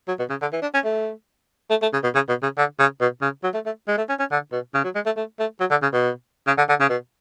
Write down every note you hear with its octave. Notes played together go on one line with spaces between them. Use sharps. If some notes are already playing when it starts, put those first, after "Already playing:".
F#3
B2
C#3
D3
E3
D4
C#4
A3
A3
A3
C#3
B2
C#3
B2
C#3
D3
C#3
B2
C#3
F#3
A3
A3
G#3
A3
C#4
C#4
D3
B2
C#3
F#3
G#3
A3
A3
A3
F#3
D3
C#3
B2
C#3
D3
D3
C#3
B2